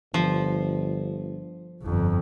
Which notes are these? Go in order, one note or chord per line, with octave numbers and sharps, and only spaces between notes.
G1 F3
G1 F2